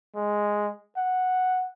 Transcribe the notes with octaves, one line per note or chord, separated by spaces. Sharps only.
G#3
F#5